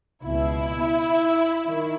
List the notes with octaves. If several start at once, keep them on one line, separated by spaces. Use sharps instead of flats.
C#2 B2 E4
D#3